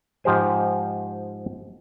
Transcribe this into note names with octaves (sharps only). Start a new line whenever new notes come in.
G#2 F3 G4 C5 G#5